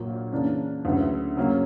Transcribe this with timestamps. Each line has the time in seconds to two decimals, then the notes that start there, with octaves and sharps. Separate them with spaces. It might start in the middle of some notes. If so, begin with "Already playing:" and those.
Already playing: A#1 A#2 F#3 A#3
0.32 C#3 E3 A#3 D4
0.85 D2 C#3 F#3 B3 E4
1.37 F#2 C#3 F#3 A#3 C#4